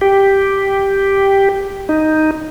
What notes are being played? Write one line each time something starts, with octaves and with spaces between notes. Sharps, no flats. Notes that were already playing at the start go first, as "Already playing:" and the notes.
G4
D#4